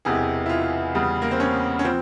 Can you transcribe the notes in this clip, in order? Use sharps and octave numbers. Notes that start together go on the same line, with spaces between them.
E1 E2 C3 E3 G#4
E4
F4
E2 C#3 G3
A#3
C4
C#4
C#4
F3 C4